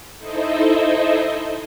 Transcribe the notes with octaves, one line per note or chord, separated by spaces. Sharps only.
D#4 E4 A4 C5 D#5 E5